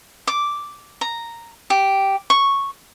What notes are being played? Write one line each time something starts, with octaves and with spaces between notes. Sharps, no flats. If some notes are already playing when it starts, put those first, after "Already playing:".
D6
A#5
G4
C#6